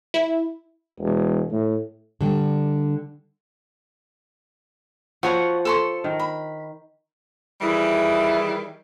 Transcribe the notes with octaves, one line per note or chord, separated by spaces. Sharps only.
E4
E1
A2
D3 G3
F3 F#4 C#5 F#5
A4 C6 C#6
D#3
B5
D#3 E3 G3 E4 G#4